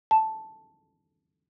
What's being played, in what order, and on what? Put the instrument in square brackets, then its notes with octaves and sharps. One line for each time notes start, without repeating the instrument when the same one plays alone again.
[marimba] A5